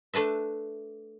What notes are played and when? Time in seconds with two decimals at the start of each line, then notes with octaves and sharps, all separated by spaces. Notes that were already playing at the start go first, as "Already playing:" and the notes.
0.14 A3 D4 B4 E5